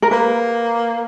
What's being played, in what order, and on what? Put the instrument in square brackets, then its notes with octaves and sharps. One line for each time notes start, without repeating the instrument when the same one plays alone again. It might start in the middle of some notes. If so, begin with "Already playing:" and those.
[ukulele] A#4
[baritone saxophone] A#3 [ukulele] B4